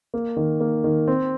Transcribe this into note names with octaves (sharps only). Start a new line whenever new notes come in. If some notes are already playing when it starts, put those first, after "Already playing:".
A#3
D#3
A#3
D#3
C4